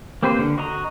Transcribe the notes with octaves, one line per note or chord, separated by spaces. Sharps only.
A#3 C4 G4 B4 C5
D3
F#4 D#5 A#5